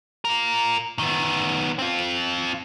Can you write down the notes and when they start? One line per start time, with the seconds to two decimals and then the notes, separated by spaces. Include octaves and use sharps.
0.25 F4 A#4
0.99 D#3 B3
1.79 C4 F4